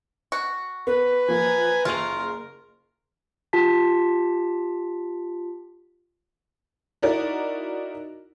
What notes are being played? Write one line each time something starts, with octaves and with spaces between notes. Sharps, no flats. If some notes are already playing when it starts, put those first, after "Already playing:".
F#4
B3 B4
F3 A#3 G#5 A#5
F#1 A3 F4 G#4 A#4 F7
F4 G4 A5 B6
D#4 E4 F#4 A#4 D5